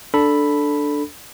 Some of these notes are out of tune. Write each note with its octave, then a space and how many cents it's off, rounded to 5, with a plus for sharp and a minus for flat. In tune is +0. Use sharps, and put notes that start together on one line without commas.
D4 +0 A4 +0 B5 +0